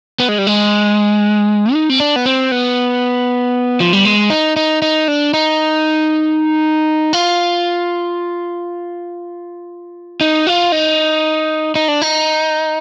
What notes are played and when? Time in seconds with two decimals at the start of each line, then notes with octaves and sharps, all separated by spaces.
0.20 B3
0.28 G#3
0.38 G3
0.47 G#3
1.73 D#4
1.89 C4
2.00 D4
2.16 B3
2.26 C4
2.52 B3
3.80 F3
3.93 G3
4.05 G#3
4.30 D#4
4.56 D#4
4.82 D#4
5.08 D4
5.34 D#4
7.13 F4
10.21 D#4
10.47 F4
10.72 D#4
11.75 D#4
11.88 D4
12.02 D#4